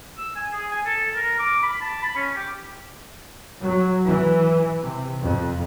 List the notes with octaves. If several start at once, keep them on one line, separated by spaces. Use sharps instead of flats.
E6
G#5
G#4
G#5
A4
A#4
D6
B5
A5
B5
C#4
G4
F#3
E3
C3
F2